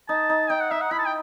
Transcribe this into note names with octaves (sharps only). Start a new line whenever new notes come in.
D#4 A5
D#4
D#4 G5
F#5
D#4 E5
F#5
E4 B5
A5
G5